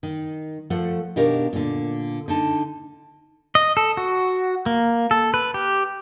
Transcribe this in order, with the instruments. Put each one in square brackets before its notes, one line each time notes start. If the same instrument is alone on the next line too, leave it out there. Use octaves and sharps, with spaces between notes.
[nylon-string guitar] D#3
F3 A3 A4 F#5
B2 D#3 D4 G4 A#4 F5
A#2 D3
D3 D#4 A5
[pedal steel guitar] D#5
A4
F#4
A#3
A4
B4
G4